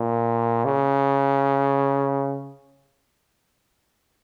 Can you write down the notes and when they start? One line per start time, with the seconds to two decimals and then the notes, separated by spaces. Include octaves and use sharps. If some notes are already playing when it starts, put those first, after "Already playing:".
Already playing: A#2
0.65 C#3